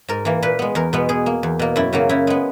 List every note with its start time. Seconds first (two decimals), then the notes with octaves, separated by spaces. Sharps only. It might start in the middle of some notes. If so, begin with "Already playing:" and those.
0.08 G#2 A#4
0.25 E3 A#3
0.42 A#2 B4
0.59 G#3 B3
0.75 E2 A#4
0.93 B2 G#3 B3
1.09 B2 G#4
1.26 A#3
1.43 E2
1.59 B2 A#3
1.76 F#2 E4
1.93 C#3 F#3 A#3
2.09 C#3 E4
2.27 G#3 B3